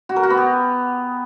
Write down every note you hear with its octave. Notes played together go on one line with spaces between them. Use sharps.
F#4
A#4
F#4
B3
G4